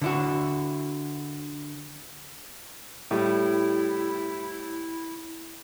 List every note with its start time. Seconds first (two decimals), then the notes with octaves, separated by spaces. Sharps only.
0.02 D3 E4 F#4
3.11 A2 G3 E4